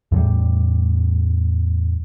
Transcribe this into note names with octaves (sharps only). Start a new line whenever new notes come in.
E2 A2 G3